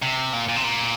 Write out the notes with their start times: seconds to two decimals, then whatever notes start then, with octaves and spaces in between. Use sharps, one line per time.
0.02 C3
0.33 A#2
0.48 A#2
0.56 C3
0.64 A#2